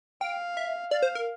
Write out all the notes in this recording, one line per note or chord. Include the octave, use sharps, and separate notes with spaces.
F5 G5
E5
D5 F5
C5
A#4